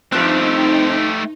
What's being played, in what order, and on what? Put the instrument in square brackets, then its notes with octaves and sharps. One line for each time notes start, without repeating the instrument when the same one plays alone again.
[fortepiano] G2 F3 F#6 [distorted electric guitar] A3 G4 [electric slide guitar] C4 [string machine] D#4